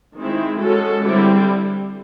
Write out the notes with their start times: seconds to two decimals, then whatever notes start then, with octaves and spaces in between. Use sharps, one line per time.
0.16 D#3 G#3 C4 E4
0.60 G#3 C#4 F#4 A4
1.04 D3 G3 C4 E4